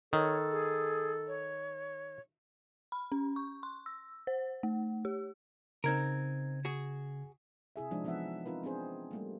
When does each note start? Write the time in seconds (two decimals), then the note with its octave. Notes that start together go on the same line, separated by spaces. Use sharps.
0.13 D#3 A4 C#5
0.51 G#4
1.27 C#5
2.92 B5
3.12 C#4
3.36 C#6
3.63 C6
3.86 E6
4.27 C5
4.63 A3
5.05 G4
5.84 C#3 C4 D#4 A#4 G#6
6.65 F#4 G#4
7.76 C3 E4 G#4 E5
7.91 F3 G#3 D4 D#4
8.04 E3 F3 B3 D#4 E5 F#5
8.46 C4 D#4 F4 A#4 B4
8.63 B3 C4 D4 G#4 C5
9.11 G3 A3 A#3